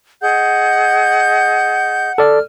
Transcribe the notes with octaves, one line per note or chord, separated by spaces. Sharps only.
G#4 D#5 F#5 G6
A4 D5 F6